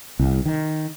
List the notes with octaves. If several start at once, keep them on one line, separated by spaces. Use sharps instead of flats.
C2
D#3